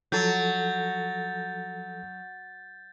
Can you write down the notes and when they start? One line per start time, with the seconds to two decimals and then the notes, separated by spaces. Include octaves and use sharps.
0.12 F3 F#3 A4 G6 A6